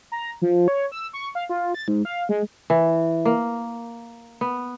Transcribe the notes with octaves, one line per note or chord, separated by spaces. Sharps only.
A#5
F3
C#5
E6
C#6
F5
F4
A6
G#2
F5
G#3
E3
A#3
B3